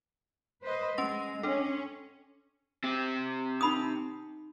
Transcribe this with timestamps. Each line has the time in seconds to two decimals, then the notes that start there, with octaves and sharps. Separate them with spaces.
0.62 B4 C5 D#5
0.98 G#3 C#4 C6 A#6
1.43 C#4 D4 A4
2.84 C4 G4
3.61 D#4 B5 D#6